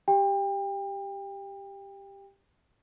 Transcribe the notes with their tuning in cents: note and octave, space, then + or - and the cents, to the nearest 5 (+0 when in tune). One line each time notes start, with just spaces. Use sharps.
G4 +0 G5 +30